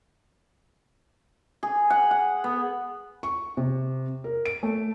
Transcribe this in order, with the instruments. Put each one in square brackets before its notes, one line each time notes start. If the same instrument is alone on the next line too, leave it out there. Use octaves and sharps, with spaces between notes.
[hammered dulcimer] G#4
F#5
F#5
B3
[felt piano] C#6
C3
A#4
D7
A3